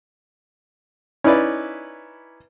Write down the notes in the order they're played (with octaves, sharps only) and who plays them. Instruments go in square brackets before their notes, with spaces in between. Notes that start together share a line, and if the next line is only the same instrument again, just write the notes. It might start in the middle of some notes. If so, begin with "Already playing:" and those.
[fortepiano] C#4 D#4 E4 B4 D5